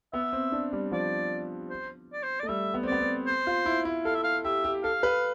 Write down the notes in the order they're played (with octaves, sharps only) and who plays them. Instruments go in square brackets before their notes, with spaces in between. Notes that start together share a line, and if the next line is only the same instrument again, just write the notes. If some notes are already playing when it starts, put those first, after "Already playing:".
[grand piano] B3 [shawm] E5
[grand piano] C4
D4
G3
[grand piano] F3 [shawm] D5
[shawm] C5
D5
C5
[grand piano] A3 [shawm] D5
[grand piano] G3 [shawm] E5
[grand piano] B3
C4
[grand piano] B3 [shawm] D5
[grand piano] C4
[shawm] C5
[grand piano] F4
E4
E4
[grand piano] A4 [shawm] F5
[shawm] E5
F5
[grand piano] G4 [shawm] E5
[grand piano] G4
[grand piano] A4 [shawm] F5
[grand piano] B4